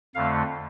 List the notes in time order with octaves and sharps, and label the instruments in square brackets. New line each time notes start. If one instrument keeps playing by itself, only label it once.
[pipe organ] F2 D3 A3 F5